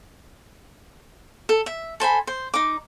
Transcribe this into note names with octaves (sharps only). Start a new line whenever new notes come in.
A4
E5
A4 C5 G#5 B5
C5
D#4 D6